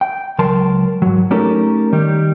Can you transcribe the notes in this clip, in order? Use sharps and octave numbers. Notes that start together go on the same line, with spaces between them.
G5
C#2 F#3 A#4 A5 C6
G#2 F#3
A3 C#4 D#4 G4 A4 A#4
D#3 G3 G4